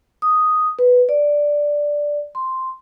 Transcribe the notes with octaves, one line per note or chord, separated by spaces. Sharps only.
D#6
B4
D5
C6